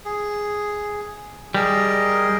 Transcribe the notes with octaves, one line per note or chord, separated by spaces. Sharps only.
G#4
G3 G#4 A#4 D#5